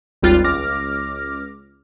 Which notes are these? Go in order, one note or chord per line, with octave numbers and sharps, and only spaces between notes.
G#1 D#2 G3 F4 F#6 A6
C#2 D6 F6 A#6